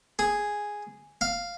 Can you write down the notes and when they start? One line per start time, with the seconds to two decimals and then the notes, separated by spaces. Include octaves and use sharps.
0.19 G#4
1.21 F5